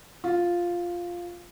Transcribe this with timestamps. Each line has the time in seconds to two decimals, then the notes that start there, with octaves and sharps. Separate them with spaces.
0.24 F4